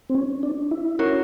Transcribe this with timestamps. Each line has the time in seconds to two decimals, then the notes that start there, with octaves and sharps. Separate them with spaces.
0.09 C4
0.15 C#4
0.43 D4
0.71 E4
0.99 C#4 F#4 A#4 C#5